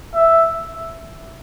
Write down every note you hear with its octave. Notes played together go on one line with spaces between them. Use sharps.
E5